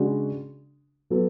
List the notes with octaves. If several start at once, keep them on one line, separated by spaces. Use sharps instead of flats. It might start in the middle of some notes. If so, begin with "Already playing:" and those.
Already playing: C#3 G#3 D4 F#4
F#3 B3 F#4 A4